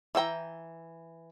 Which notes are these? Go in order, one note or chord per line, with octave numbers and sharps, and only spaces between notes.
E3 E5 G5 A#5